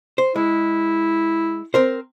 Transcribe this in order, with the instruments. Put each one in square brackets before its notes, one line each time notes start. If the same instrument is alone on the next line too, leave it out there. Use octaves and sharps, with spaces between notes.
[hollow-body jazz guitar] C5
[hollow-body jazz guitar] G#3 [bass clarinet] E4
[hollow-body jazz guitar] C4 A#4 C5